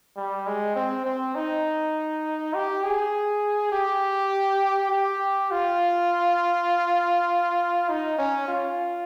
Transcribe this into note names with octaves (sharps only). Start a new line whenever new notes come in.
G3
G#3
C4
C4
D#4
G4
G#4
G4
G4
F4
D#4
C#4
F4